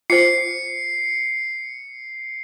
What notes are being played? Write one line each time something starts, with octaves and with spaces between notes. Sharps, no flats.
F4 C5 C7 C#7